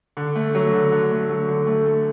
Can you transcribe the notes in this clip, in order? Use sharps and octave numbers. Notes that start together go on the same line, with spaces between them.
D3
A3
F#3
D3
D3
A3
F#3
D3
A3
A4